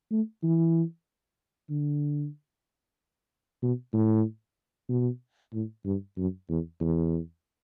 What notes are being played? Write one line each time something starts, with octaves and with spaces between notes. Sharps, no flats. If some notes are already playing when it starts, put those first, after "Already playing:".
A3
E3
D3
B2
A2
B2
A2
G2
F#2
E2
E2